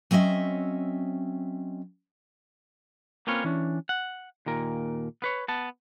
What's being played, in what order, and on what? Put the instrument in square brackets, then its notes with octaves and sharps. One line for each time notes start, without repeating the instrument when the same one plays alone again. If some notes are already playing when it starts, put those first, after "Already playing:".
[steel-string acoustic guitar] F#3 C4 C#4 D#5 E5
[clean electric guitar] A#3 C4 C#4 F4 B4 C#5
E3 C#4 D4
F#5
D#2 A#2 A#4
B3 B4 C#5
B3 A5